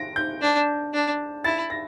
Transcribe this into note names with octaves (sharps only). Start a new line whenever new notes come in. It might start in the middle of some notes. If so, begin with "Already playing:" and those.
Already playing: A#6 D7
G6
D4
D4
E4 A6
A#6